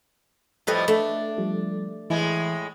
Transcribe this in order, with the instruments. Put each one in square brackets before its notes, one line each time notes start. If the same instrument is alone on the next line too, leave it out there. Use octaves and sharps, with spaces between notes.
[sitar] A2 F3 G3 [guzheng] A4 B4 D#5
[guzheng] A3 [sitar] D4
[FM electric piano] F3 G3
[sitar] A2 G#3 E4 [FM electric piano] E3